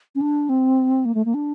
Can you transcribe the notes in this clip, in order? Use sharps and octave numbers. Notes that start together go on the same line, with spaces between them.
C#4
D4
C4
A#3
A3
A#3
D4